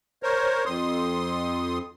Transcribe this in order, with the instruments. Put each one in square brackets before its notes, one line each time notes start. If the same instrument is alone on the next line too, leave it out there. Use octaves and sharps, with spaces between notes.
[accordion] A#4 C5 C#5
F2 C6 D#6